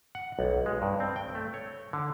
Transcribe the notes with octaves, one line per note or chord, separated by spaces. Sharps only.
F#5
B1
G#3
G2
C4
G5
A3
C#5
D3